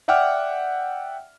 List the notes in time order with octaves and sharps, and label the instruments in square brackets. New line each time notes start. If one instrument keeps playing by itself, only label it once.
[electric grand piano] D5 E5 F#5 G5 D6 F6